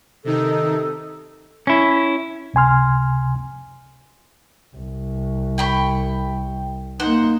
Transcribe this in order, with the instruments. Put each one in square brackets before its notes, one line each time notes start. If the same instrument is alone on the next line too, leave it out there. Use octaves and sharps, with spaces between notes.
[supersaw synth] C3 D#3 D#4 [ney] A4
[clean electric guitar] C#4 E4
[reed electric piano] C#2 C3 G#5 C6 F6
[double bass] C2
[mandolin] G5 B5 C#6
[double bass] A#3 D#4 [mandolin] C5 F#5